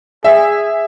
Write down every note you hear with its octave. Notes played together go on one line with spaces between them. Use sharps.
G#4 E5